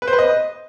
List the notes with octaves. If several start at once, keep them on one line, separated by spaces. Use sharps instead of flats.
B4
C5
B4
D#5